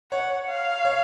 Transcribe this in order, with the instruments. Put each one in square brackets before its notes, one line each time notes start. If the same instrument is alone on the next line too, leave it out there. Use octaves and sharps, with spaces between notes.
[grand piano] C#5 [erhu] F#5
[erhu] F5
[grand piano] C#5